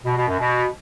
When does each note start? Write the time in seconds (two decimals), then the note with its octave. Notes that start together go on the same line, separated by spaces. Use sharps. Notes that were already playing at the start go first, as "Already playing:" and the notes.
0.05 B2
0.16 B2
0.28 F#2
0.39 B2